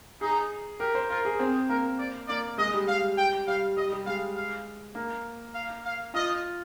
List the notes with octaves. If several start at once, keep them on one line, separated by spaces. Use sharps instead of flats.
D#4 G#4
G4 A#4
C5
F4 A#4
G#4
C4 G#4
A#3 A#4
D5
A#3 D5
G#3 D#5
G3
G3 F5
G5
G3 F5
G3 D#5
G3
G#3 F5
F5
A#3
F5
F5
F4 D#5